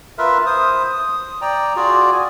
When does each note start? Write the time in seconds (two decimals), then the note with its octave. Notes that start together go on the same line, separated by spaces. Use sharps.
0.18 F4 A#4 B4 E5
0.46 C5 D#6
0.84 D#6
1.42 D5 G5 A#5
1.76 F4 F#4 G#4 D5
2.12 G#5